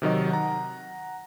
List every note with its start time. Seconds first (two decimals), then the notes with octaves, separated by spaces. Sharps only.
0.02 C3 D#3 F#3 D#5
0.30 F#5 A#5